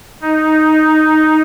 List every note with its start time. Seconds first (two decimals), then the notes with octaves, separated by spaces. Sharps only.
0.22 D#4